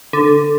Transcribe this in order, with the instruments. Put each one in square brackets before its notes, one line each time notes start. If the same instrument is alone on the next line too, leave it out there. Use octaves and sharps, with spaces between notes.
[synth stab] D3